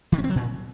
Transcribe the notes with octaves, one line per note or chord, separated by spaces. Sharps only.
D#3
C#4
C4
F#3
A#2